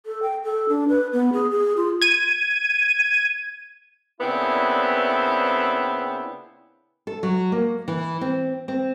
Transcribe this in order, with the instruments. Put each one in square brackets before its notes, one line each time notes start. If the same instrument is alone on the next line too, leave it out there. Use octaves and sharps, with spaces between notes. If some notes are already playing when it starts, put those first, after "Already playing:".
[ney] A4
G5
A4
D4
B4
B3
G#4
G#4
F4
[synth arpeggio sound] G#6 D#7
[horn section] A#2 C#3 B3 C4 D4 E4
[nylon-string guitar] A4
F#3
A#3
E3
C4
C4